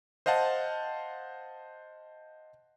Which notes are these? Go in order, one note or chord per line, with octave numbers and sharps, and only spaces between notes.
C5 D#5 F5 F#5 A5